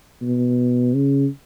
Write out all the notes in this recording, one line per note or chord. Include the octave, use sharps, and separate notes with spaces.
B2
C#3